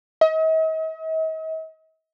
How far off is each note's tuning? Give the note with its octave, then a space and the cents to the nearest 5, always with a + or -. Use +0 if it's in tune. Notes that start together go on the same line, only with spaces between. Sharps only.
D#5 +45